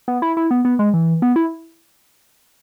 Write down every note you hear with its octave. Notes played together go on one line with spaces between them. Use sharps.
B3
E4
E4
B3
B3
G#3
E3
B3
E4